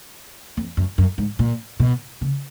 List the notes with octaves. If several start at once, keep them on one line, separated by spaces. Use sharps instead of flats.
F2
F#2
F#2
G#2
A#2
B2
C#3